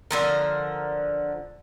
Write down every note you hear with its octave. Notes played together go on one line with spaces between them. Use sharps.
D3 F3 A#4